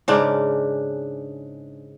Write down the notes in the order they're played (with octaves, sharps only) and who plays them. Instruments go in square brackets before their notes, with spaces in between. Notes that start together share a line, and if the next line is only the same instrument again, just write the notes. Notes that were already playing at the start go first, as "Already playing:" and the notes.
[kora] G#2 C#3 D4